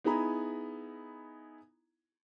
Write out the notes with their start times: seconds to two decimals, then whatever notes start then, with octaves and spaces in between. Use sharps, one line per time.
0.04 B3 D#4 E4 G#4 A#5 B5